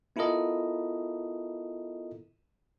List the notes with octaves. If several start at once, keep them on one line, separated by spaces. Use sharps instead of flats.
B3 E4 F4 A4 A#4 D#5